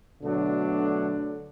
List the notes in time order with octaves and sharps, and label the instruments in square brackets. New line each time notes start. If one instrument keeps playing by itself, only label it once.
[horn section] B2 F#3 A3 D4 [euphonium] D3